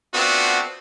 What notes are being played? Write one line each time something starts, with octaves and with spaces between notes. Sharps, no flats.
A3 B3 C4 D4 F4 F#4